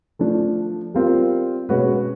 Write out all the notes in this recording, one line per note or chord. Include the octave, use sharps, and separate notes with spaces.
F3 A3 D4
G3 C4 F4 A#4
B2 G#3 C#4 F#4 B4